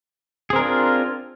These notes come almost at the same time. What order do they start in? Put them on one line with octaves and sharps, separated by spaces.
G#4 C4 A#4 D4 F4